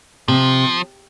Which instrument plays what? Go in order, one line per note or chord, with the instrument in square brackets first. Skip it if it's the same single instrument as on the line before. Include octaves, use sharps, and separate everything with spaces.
[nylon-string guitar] C3 [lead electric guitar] F3